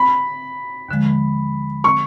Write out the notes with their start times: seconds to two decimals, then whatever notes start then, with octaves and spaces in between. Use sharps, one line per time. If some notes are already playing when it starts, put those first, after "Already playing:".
Already playing: B5
0.89 D#2 D3 F3 G#3
1.84 C#6